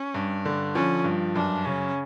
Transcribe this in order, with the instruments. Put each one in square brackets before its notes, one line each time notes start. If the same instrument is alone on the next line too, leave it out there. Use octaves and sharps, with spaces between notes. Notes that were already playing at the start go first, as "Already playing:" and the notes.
Already playing: [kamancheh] C#4
[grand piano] G2
D3
[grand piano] F3 [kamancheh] C#4
[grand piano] G2
[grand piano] F#2 [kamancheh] D4
[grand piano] C#3 [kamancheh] C#4